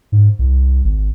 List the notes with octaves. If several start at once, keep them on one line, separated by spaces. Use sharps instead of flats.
G#2
C2
G#1